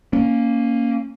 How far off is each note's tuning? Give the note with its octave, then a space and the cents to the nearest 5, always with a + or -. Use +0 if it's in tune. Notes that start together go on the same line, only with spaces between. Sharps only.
A#3 +0 C#4 +0